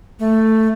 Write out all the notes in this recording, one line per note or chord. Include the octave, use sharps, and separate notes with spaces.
A3